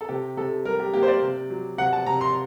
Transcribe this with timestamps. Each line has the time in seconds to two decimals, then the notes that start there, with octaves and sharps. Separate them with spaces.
0.01 A4
0.09 C3 G4
0.37 C3 A4
0.65 G3 A#4
0.80 G4
0.94 A#3 G4
1.03 C5
1.08 D5
1.22 C3
1.50 F#3
1.78 C3 F#5
1.93 A5
2.06 C3 A#5
2.21 C6